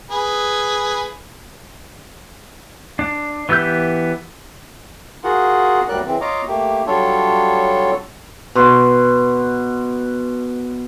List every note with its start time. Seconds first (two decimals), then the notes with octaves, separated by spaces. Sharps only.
0.10 G#4 B4
2.99 D4
3.49 E3 B3 G4 E6 G6
5.24 F4 F#4 G#4 A#4 F#5
5.88 D2 F#3 G3 A#4 D5 F#6
6.06 C#3 E3 C4
6.21 F4 C#5 D#5 F5 A#5 D6
6.48 A3 A#3 G4
6.87 F#3 G3 D4 F4 A4 C#5
8.55 B2 C6